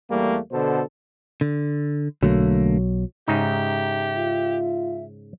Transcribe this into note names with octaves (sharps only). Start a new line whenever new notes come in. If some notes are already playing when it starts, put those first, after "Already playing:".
E2 G3 A3 A#3
B2 D3 A4 C5
D3
B1 D3 F#3 A3 A#3
G#2 C#3 D#4 G4 E5
F4